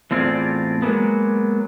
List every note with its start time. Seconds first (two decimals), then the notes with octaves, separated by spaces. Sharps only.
0.11 E2 A2 C4 F4 G#4 D5
0.82 F#3 G#3 A#3 B3